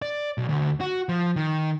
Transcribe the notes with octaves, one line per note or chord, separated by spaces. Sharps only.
D5
B1
D2
F#4
F3
D#3